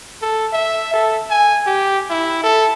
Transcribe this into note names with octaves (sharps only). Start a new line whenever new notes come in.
A4
E5
A4
G#5
G4
E4
A4